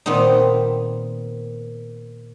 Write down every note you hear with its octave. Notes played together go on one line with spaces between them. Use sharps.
A#2 D#3 B3 C4 D#4